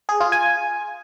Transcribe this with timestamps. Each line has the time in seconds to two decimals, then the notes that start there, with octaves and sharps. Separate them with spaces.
0.09 G#4
0.20 F4
0.32 G#5